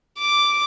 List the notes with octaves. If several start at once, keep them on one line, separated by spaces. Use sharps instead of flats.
D6